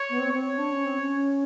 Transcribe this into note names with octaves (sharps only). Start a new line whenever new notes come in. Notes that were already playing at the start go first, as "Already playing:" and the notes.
Already playing: C#5
B3
C4
C4 C#5
D4
C#4
C4
C#4